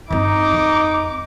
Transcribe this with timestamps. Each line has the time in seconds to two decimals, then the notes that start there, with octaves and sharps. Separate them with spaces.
0.11 G2 C4 D#4 D6
0.53 F2 C4